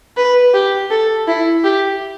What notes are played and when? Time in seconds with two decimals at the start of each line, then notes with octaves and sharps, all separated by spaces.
0.17 B4
0.54 G4
0.90 A4
1.27 E4
1.64 G4